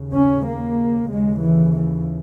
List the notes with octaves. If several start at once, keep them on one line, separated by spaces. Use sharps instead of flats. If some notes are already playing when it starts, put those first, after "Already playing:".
Already playing: D#2 C#3
C#4
A#3
D#2 C#3 G#3
E3
E3